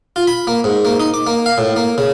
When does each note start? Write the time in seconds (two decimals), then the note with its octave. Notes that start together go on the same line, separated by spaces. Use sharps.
0.16 F4
0.27 B5
0.47 A#3
0.64 G#2
0.85 A#3
1.00 D#4
1.14 D6
1.27 A#3
1.46 F5
1.58 A2
1.76 A#3
1.98 C#3